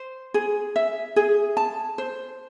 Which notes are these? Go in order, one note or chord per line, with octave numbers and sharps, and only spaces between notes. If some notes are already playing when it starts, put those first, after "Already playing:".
Already playing: C5
G#4
E5
G#4
A5
C5